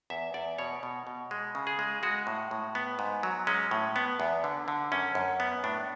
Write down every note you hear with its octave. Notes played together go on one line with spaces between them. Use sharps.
E2 E5
E2 D5
B2 C#5
B2
B2
G#3
C#3
G#4
G#3
G#3 F#4
A2
A2
B3
G#2
F#3
G#3 C#4
A2
B3
E2
D3
D3
F#2 C#4
F#2
B3
A2 D4